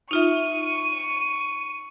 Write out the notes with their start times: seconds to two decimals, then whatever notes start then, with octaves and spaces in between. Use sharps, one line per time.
0.11 D#4 F4 E5 C#6 D#7